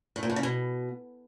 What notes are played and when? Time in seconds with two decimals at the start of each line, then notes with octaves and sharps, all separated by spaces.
0.16 A2
0.23 A#2
0.30 A2
0.36 C#3
0.43 B2